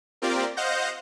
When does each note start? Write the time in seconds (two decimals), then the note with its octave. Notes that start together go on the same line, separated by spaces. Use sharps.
0.22 A#3 C4 F4 G4 A#4 D5
0.57 C5 D#5 F5 F#5 G6 A#6